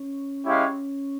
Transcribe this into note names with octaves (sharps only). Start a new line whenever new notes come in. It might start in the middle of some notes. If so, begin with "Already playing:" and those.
Already playing: C#4
G#3 E4 G4 C#5 F5